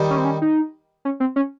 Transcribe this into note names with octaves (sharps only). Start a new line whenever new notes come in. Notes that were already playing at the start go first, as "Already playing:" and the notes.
Already playing: D#3 G3
C#4
C4
C#4
D#4
C#4
C4
C#4